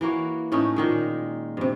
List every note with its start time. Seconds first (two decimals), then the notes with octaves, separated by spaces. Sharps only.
0.01 E3 A#3 F#4 C#5
0.52 A2 A3 C#4 D#4
0.76 A#2 D#3 G#3
1.57 G2 C3